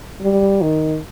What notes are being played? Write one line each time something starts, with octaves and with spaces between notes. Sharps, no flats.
G3
D#3